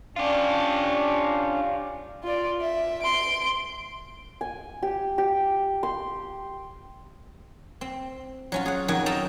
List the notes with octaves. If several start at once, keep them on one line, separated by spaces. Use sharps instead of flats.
C#4 D4 F4 G4
F4 D5
E5
C6 D7
G#5
G4
G4
C6
C4
F#3 C#4 F4
G#4 F#5
F2 D#3 F#3 A#4 F#5 G#5
A4 D#5 G5 A5 A#5